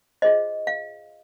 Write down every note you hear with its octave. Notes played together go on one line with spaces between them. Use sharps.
F4 G#4 C5 D#5
F5